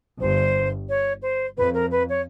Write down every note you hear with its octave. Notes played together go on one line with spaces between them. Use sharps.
G1 G2 C5
C#5
C5
F2 B4
A#4
B4
C#5